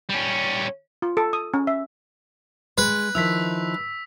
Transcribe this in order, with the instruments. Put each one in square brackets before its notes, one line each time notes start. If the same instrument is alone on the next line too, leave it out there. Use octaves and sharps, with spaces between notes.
[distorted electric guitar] G3 C#4
[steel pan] F4
A4
D#6
C#4
E5
[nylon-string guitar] G#3 [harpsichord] B4
[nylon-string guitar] D#3 F3 E4 [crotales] E6 B6